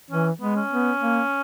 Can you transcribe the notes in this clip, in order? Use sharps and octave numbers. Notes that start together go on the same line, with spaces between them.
E3 C#4
G#3 B3
C#4
B3
A#3